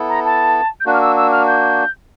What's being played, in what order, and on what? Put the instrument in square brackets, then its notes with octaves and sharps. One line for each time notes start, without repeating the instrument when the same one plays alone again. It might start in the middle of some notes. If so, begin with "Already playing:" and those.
Already playing: [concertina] B3 E4 A4
[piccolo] A#5
A5
G6
[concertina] A#3 D4 F#4 [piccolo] F#6
[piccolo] F6
E6
E6
F6
G6